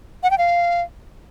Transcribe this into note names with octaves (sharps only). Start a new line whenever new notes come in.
F#5
G5
F5